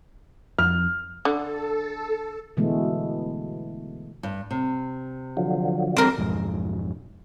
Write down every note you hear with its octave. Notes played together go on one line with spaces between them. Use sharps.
F2 F6
D3 A4
B2 D3 E3 G#3 A3 B3
G2
C3
D3 F3 F#3
E3 G3 C4 D4 A#4
B1 F2 G#2